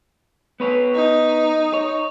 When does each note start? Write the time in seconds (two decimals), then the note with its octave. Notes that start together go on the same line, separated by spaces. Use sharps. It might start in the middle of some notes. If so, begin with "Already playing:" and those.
0.60 B3 B4 C#5
0.95 D#4
1.74 C#5